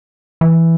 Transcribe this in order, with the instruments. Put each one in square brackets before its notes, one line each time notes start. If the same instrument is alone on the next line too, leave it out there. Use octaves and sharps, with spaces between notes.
[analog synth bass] E3